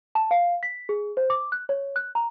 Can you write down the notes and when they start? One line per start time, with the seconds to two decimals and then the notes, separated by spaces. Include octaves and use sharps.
0.15 A5
0.31 F5
0.63 B6
0.89 G#4
1.17 C5
1.30 D6
1.52 F#6
1.69 C#5
1.96 F#6
2.15 A#5